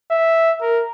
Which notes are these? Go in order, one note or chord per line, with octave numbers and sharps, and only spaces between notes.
E5
A#4